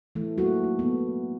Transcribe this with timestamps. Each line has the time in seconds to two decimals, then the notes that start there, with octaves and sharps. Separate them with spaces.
0.15 E3 A3
0.38 F#3 A3 A#3 F#4
0.64 D#4
0.79 B3